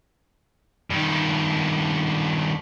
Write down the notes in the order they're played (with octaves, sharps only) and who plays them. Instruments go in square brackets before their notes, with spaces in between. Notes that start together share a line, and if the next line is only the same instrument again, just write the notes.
[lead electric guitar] G2 D#3